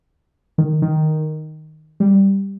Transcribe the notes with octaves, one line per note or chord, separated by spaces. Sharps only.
D#3
D#3
G3